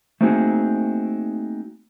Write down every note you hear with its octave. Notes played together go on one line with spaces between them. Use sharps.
A3 A#3 C4 D#4 F#4 G#4